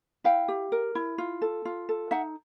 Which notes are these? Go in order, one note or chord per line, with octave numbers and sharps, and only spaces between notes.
E4 F5 G5
G4
A#4
E4
F4
A4
F4
A4
D#4 E5 F#5